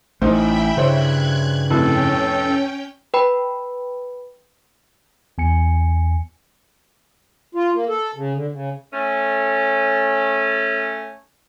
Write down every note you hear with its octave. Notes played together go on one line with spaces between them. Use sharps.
A1 A3 D#4 C5 E5 G5 B5
G2 C#3 E4 C5 C#5 F#6 G#6
F1 A2 C3 C#4 A4 G5
B4 G5 B5
E2 G#5 C#7
F4
A#3
A4
C#3
D3
C#3
A3 C#4